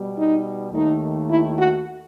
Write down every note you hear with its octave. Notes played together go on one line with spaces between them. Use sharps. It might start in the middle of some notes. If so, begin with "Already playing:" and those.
Already playing: B2 G3
D#4
D#2 D#3 A3 D#4
E4
F#4